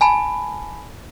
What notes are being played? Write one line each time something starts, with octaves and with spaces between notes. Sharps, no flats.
G#5 A5 B5